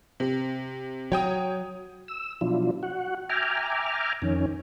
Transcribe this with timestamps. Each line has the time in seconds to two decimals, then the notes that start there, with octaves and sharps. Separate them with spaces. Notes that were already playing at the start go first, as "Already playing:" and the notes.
0.20 C3
1.12 F#3 C#5 G5 D#6
2.08 E6
2.41 B2 F3 F#3 D4 E4 F4
2.83 F#4 F#5
3.30 E5 G5 G#5 A#5 D6 F6
4.22 F2 D#3 C#4